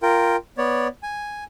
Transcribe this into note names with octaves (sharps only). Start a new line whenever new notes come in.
F4 A#4 G5
B3 C#5 D5
G#5